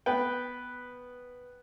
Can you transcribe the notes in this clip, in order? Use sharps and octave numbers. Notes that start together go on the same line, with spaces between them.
B3 B4 G5